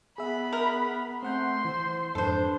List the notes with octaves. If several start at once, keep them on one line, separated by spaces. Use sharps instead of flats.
B3 G#4 E5 B5
A#4
A3 C4 F#5 C6 G6
E3 C5
F2 G#2 D4 A4 B4 C5